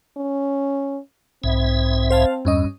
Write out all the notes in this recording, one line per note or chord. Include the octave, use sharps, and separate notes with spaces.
C#4
B1 G#2 C4 E5
C5 F5 A5
E2 G2 C#4 D#5